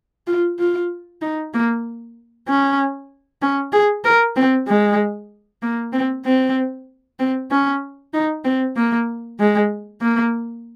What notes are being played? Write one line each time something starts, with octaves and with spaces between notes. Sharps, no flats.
F4
F4
D#4
A#3
C#4
C#4
G#4
A#4
C4
G#3
A#3
C4
C4
C4
C#4
D#4
C4
A#3
G#3
A#3